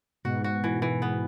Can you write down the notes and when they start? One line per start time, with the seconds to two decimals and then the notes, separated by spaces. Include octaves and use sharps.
0.25 G#2 B2 F#4
0.44 F#4
0.64 E3
0.82 E3
1.02 B3